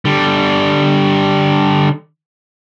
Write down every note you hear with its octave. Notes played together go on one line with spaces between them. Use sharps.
D3 G3